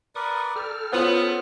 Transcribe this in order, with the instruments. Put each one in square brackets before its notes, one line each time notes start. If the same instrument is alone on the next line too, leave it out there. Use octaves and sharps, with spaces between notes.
[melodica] A#4 B4 D5 [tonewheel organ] C#6 D#6
[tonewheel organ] A4 F6 [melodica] G5
[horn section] B3 [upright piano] C#4 F4 C5